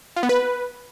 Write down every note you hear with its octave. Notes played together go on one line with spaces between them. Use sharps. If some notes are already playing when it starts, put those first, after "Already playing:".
F4
B3
B4